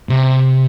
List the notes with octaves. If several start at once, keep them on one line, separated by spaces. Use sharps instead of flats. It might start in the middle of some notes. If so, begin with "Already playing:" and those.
C3